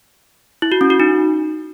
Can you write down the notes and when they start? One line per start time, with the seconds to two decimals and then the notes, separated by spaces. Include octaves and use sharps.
0.62 E4
0.72 F#4
0.81 C#4
0.90 F#4
1.00 D#4